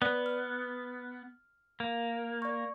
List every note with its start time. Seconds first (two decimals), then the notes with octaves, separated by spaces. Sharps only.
0.02 B3 B4 D5
0.26 F6
1.80 A#3
2.42 D5 C#6